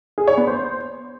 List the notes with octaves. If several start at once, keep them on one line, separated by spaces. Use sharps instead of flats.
G#4
C#5
B3
C5